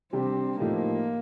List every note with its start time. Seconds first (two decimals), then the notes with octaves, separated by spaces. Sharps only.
0.13 C3 G3 C4 D4 G4
0.60 A2 F3 A3 A#3 D#4 G4